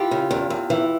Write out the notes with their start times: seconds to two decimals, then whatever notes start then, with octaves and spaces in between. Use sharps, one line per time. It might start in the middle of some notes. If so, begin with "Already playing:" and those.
Already playing: E3 F4 G4
0.11 C#3
0.31 E2
0.50 E2
0.70 E3